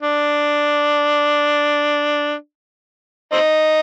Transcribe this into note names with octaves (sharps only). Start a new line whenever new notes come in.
D4
C4 D#4